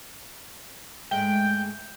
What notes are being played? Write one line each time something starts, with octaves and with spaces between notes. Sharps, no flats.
G#2 G#3 A3 G5